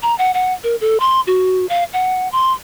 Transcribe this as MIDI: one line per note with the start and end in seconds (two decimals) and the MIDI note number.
0.03 0.16 82
0.18 0.32 78
0.34 0.53 78
0.64 0.76 70
0.81 1.00 69
1.00 1.21 84
1.27 1.67 66
1.69 1.84 77
1.93 2.28 78
2.32 2.52 84